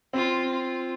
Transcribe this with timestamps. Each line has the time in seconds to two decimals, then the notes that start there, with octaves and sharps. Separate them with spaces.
0.13 C4 F4
0.51 F4